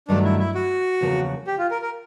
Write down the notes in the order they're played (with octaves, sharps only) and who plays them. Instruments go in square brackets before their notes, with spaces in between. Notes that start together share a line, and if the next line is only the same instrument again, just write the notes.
[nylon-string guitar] G2 D#3 F#3 A3 [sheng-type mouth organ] D4
[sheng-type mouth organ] E4
E4
F#4
[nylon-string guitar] E2 C#3 F3 A#3
[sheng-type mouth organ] G4
F4
A#4
A#4